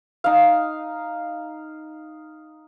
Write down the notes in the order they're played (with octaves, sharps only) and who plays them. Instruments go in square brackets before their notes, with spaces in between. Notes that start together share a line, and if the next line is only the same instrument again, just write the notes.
[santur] D#4 F5